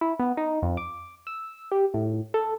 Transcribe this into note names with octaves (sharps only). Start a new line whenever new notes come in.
E4
B3
D#4
F2
D6
E6
G4
A2
A4